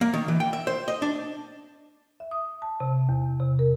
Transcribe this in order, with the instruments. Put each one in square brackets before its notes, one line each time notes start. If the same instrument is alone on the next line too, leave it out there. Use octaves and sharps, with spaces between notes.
[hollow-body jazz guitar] A#3
D#3
E3
G5
E5
C5
D#5
D4
[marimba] E5
D#6
A5
C3
E2
C3
A#4